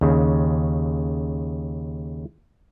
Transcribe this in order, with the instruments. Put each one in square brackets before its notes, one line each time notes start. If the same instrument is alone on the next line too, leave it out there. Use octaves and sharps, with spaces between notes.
[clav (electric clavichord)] D#2 C#3